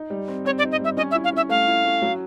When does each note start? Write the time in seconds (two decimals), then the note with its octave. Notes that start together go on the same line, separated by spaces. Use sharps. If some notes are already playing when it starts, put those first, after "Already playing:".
Already playing: D#4
0.10 G3
0.28 C4
0.45 C4 C#5
0.58 D5
0.63 D#4
0.72 D#5
0.80 G3 E5
0.97 C#4 D#5
1.11 E5
1.15 E4
1.24 F5
1.32 C#4 E5
1.49 A3 F5
1.67 E4
1.85 C#4
2.02 F#3